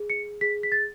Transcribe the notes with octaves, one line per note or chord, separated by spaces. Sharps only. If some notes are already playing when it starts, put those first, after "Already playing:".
Already playing: G#4
C#7
G#4 B6
B6
A6